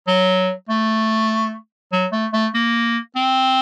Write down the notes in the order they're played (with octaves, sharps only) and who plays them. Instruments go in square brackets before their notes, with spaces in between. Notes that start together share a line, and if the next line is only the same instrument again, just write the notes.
[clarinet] F#3
A3
F#3
A3
A3
A#3
C4